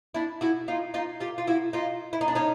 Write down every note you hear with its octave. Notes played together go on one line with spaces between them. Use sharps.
D4 E4
E4 F#4
D#4 F4
D#4 F4
F4 G4
F4
E4 F#4
D#4 F4
E4
D#4
D4
C#4 D#4